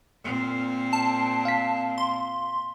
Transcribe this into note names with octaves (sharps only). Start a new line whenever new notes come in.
A#2 C4
A5
F5 B6
C6